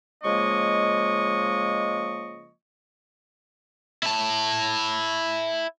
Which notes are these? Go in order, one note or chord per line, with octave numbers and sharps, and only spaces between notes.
C#3 F3 G#3 A#3 D#5 C#6
E4 A5